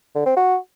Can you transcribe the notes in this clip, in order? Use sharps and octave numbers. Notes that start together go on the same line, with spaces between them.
D3
C4
F#4